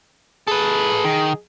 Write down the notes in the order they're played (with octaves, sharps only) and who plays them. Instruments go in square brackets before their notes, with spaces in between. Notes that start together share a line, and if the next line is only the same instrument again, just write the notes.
[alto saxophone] G#4 [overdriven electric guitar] A4 B4
[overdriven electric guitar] D#3